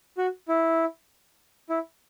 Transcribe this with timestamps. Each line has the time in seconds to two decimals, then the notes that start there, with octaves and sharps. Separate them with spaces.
0.17 F#4
0.48 E4
1.70 E4